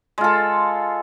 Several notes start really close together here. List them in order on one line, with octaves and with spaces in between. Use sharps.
G#3 F4 A4